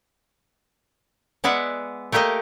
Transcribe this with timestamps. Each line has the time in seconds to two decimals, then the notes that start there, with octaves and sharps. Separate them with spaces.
1.44 G#3 B3 D5 E5 F#5
2.12 A3 A#3 G4 A#4 D#5